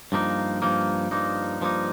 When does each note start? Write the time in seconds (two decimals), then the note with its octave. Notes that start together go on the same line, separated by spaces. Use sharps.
0.12 G2 F3 A#3 D#4
0.62 G2 F3 A#3 D#4
1.11 G2 F3 A#3 D#4
1.61 G2 F3 A#3 D#4